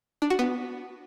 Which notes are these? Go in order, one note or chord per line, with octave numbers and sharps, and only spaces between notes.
D4
F#4
B3